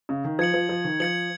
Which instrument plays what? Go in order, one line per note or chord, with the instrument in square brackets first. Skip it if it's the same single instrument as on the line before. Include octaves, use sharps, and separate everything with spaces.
[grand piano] C#3
D#3
[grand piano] F3 [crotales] G#6 C#7 F#7
[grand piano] F3
F3
D#3
[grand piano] F3 [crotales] G#6 C#7 F#7